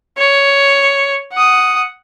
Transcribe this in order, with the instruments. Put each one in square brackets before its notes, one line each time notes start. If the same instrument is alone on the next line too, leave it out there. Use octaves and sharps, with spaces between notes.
[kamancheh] C#5
F#5 D#6